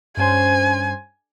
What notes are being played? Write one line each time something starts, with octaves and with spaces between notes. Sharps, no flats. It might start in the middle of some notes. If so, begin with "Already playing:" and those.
G2 C#4 C5 G#5